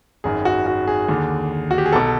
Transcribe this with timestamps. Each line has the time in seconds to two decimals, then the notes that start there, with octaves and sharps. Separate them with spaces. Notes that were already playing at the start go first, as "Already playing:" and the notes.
0.24 G#1 F#2 D#3 G#4
0.45 F#4
0.66 F#4
0.87 G#4
1.08 D#2 D3
1.71 F#4
1.78 G4
1.86 G#4
1.92 B1 B2 A4